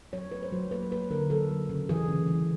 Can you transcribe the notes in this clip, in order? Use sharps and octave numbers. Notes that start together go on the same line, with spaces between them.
F#3 C#5
A3 B4
C5
F#3
A#3 B4
A#3 B4
D3 A#4
F#3 A4
F#3
C#3
E3 G#4
C#3
E3